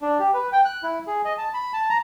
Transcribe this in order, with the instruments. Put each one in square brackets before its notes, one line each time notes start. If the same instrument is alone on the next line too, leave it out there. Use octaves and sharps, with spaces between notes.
[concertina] D4
G4
B4
G5
F#6
E4
G#4
D#5
A5
B5
A5
A#5